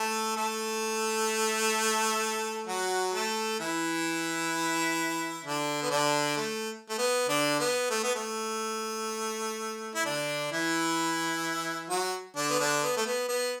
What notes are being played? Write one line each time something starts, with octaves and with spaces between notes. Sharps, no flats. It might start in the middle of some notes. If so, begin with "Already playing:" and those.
Already playing: A3 A4
A3 A4
F#3 F#4
A3 A4
E3 E4
D3 D4
B3
D3 D4
A3
A3
B3
D3 D4
B3
A3
B3
A3
E4
D3 D4
E3 E4
F#3 F#4
D3 D4
B3
D3 D4
B3
A3
B3
B3